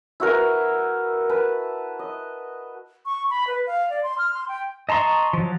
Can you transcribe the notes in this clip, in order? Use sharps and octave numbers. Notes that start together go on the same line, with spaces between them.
E4 F#4 A#4 B4
B4 A5
D#5
C#6
B5
B4
F5
D5
C6
F6
C6
G5
D#5 A5 A#5 C6 C#6
F3 F#3